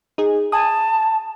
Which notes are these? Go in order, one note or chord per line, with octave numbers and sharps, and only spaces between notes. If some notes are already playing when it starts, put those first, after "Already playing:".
D#4 G#4
G#5 A5 D#6